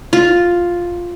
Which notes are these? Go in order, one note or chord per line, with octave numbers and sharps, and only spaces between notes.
F4